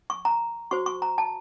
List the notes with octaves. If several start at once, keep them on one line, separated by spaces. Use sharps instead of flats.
C#6
A#5
F#4 C5 C#6
C#6
A#5
A5